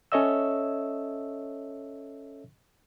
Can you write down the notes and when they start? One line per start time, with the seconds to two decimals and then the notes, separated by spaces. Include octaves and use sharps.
0.12 C#4 A4 C#5 D#5 E5 E6